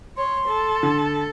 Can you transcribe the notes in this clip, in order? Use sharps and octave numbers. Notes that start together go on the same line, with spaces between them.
C#5 C6
A4
D3